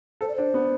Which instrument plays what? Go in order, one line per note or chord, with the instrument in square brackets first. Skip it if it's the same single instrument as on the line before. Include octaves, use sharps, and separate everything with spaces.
[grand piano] A4 [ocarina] C5
[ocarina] D5
[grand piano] D4 [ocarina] C5
[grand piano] B3